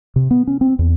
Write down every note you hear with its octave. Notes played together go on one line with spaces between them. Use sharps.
C3
B3
C#4
C4
E2